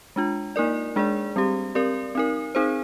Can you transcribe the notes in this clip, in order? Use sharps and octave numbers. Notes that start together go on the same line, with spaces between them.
G#3 D4 F4
A#3 D#4 A#4 D5
G#3 D4 G#4 D5
G3 C4 G4
C4 G4 A#4 D5
C4 D#4 A#4
C4 D#4 G#4 C5